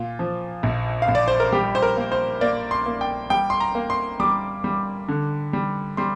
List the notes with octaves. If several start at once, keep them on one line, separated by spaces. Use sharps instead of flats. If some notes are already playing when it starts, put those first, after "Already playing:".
Already playing: A#2 F4
F3
A#1
F5
A#1
D5
C5
A#4
G3 G4
C5
A#4
A#3
C5
A#3 D5
C6
A#3
G5
G3 G5
C6
A#5
A#3
C6
G3 D6
G3
D3
G3
G3 C6